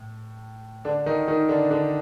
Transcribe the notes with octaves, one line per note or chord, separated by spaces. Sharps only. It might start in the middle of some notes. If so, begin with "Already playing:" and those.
Already playing: A2
D3 D4
D#3 D#4
D#3 D#4
D3 D4
D3 D4